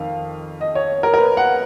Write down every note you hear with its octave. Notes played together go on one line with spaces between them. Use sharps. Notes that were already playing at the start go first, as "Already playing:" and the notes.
Already playing: F2 D#3 F5
D#5
C#5
A#4
A#4
B4
F#5